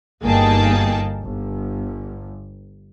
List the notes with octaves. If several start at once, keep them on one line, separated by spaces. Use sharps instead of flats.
G1 A#3 D#4 G#4 G5 A5
G1